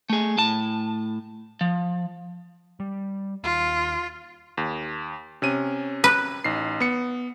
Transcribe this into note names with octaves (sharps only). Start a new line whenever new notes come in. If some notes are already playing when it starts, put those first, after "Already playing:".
A3 G#4
A2 A5
F3
G3
D#2 F4
D#2
C3 C#4 D#7
B4
A1 D#4 C7
B3 C#7